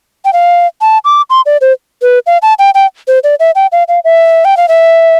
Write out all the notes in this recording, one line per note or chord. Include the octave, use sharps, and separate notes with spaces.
G5
F5
A5
D6
C6
D5
C5
B4
F5
A5
G5
G5
C5
D5
E5
G5
F5
F5
E5
G5
F5
E5